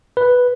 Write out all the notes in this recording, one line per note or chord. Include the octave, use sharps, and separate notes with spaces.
B4